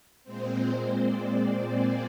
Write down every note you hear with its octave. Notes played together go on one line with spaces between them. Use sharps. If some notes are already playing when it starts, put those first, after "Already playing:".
A#2 G#3 C4 C5
D5
D5
G#4